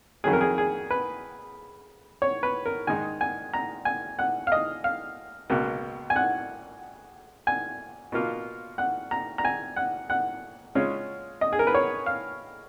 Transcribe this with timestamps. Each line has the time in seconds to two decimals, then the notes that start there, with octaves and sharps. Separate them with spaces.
0.24 F2 D#3 F#3 G#4
0.33 A#4
0.41 G#4
0.58 G#4
0.91 B4
2.22 C#5
2.43 B4
2.66 A#4
2.87 G#2 D#3 G#3 D#4 G#5
3.21 G#5
3.53 A#5
3.85 G#5
4.19 F#5
4.47 F5
4.52 D#5
4.84 F5
5.50 C#2 B2 A#3
6.10 G#5
6.16 F#5
7.47 G#5
8.12 B2 A#3 F4
8.78 F#5
9.11 A#5
9.38 A#5
9.45 G#5
9.76 F#5
10.10 F#5
10.75 C#3 G#3 C#4 F4
11.41 D#5
11.53 G#4
11.59 A#4
11.67 B4
11.75 C#5
12.06 F5